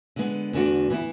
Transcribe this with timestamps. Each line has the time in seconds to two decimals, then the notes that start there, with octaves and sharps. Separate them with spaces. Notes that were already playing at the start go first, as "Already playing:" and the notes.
0.16 D3 G#3 B3
0.53 E2 D3 A3 D4 F#4
0.90 E3 B3 E4